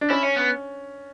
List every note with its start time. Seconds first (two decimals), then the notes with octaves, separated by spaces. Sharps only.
0.01 D4
0.10 C#4 E4
0.23 C#4
0.36 B3